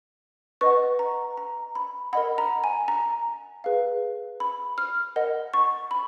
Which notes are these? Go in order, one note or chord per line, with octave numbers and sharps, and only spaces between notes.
B4 D#5 F#5 C#6
A#5
A#5
B5
A#4 D#5 F#5 B5
A#5
G#5
A#5
G#4 B4 F5
B5
F6
A#4 D#5 F#5
C#6
B5